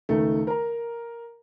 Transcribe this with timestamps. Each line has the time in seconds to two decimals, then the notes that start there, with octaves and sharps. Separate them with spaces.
0.09 C#2 D#3 A3
0.47 A#4 A#5